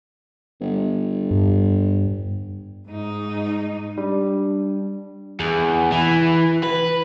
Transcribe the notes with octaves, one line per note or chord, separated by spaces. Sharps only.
G1
G2
G#2 D#4
G3 D4
E2
E3
B4